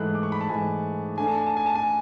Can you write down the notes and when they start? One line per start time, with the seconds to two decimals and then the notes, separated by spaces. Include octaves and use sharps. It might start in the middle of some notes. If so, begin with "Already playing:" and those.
Already playing: G#2 E3 A3 F#6
0.15 D6
0.23 C#6
0.32 B5
0.41 A5
0.49 G#2 E3 A3 G#5
1.18 D3 A3 D4 G#5
1.28 A5
1.38 G#5
1.47 A5
1.57 G#5
1.66 A5
1.75 G#5